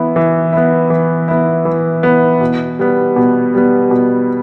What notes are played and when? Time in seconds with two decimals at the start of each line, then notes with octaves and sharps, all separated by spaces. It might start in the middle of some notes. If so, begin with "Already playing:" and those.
Already playing: E3 B3 E4
0.16 E3
0.53 B3 E4
0.90 E3
1.28 B3 E4
1.65 E3
2.03 B3 E4
2.41 B2
2.79 G3 B3
3.16 B2
3.54 G3 B3
3.91 B2